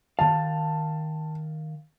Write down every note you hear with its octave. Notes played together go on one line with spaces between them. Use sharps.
D#3 F5 A5